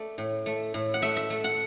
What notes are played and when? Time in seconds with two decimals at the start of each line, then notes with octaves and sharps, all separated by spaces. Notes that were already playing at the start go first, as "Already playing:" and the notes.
Already playing: A3 D5
0.18 A2
0.46 A3
0.74 A2
0.94 F#5
1.02 A3 E5
1.16 E5
1.30 A3
1.44 F#5